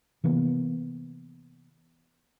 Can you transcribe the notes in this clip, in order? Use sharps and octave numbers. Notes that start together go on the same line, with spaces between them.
C3 E3 A#3 B3